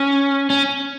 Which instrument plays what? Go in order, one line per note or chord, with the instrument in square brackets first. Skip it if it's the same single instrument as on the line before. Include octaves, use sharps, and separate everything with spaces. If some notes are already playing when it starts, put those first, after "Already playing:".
Already playing: [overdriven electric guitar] C#4
C#4